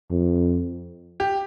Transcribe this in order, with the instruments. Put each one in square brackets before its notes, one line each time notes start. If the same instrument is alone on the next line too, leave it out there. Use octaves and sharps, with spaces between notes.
[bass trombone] F2
[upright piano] G4